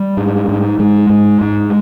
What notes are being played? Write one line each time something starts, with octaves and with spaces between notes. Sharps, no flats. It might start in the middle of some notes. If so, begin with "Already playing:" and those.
Already playing: G3
G#2
G#2
G#2 G#3
G#2
G#2